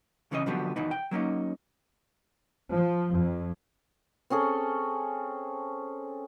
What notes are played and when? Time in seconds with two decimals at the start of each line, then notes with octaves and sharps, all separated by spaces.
0.31 B1 C#3 E3 C#4 A4 D#5
0.46 B2 D3 F3 F#3 B3 G4
0.76 E2 B2 D#3 E3 B3 D#4
0.91 G5
1.11 F#3 A#3 C#4 D#4
2.75 F3
3.14 F2
4.30 C4 C#4 G#4 A4